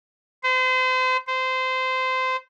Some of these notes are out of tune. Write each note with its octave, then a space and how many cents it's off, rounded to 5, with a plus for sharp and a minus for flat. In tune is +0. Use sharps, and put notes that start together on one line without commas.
C5 -35
C5 -20